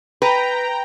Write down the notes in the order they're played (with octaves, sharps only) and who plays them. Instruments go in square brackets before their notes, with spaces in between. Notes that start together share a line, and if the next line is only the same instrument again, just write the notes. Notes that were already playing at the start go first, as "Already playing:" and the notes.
[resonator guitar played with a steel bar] B4 [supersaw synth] G5 A#5